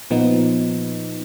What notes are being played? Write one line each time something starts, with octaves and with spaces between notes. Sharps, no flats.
A#2 F3 B3 D#4